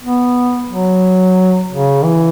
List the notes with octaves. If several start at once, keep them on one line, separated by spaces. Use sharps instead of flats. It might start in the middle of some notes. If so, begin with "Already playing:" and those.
B3
F#3
C#3
E3